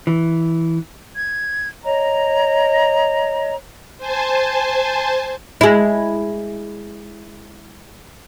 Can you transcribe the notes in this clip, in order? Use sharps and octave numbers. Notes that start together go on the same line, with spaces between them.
E3
G#6
C#5 D#5 A#5
C5 G#5 A5
G#3 E4